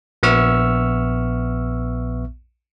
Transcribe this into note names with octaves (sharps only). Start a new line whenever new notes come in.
A#1 B3 E5 C#6 E6 F6